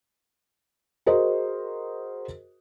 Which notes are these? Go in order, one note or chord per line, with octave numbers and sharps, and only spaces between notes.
F#4 G#4 A#4 C5 D#5